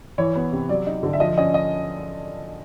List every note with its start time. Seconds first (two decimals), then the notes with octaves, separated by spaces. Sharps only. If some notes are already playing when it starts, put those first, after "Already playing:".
0.18 E3 C#5
0.35 B3
0.52 C3
0.69 F#3 D5
0.87 D#4
1.03 D3
1.13 E5
1.20 F3 D#5
1.37 C#4 D#5
1.54 D#5